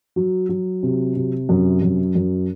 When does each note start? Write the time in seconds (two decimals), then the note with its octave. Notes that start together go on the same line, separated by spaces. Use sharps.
0.16 F#3
0.49 F#3
0.83 C3
1.16 C3
1.49 F#2
1.82 F#2
2.15 F#2